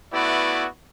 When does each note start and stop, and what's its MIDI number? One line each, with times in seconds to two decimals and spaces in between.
0.13 0.67 57
0.13 0.67 59
0.13 0.67 64
0.13 0.67 66
0.13 0.67 71
0.13 0.67 74